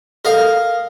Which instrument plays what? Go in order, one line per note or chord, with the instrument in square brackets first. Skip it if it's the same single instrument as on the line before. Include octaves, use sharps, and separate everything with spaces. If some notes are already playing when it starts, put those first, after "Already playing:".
[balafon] A4 [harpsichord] A#4 D#5 F5